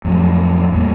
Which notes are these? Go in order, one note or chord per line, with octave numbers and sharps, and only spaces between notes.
F2 A2 F#3
E2 A2 G3 A#3